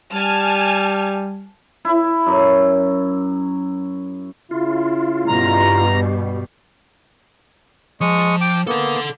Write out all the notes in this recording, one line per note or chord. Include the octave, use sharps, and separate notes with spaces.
G3 G#5 A5 F6
E4
F#2
C#3 E4 F4
G2 B2 G3 A#5
F3 G#3 C#6 D#6
G5 D6
A#3 B3 A4 F#5